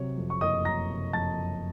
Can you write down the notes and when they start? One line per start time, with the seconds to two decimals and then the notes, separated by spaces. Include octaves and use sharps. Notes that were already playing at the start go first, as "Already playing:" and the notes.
Already playing: C3 F#3 C#5
0.18 F2
0.30 C#6
0.41 F#1 D#5 D#6
0.65 F#3 A#5 A#6
0.90 C3
1.13 F2 A5 A6
1.38 F#1